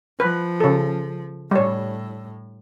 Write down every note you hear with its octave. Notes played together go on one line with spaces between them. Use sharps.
F3 B4
C#3 A4
A2 G3 C#5